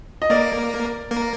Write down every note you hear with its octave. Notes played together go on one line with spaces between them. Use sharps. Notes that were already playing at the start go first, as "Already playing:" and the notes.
D#5
A#3 A#4 D5
A#3 A#4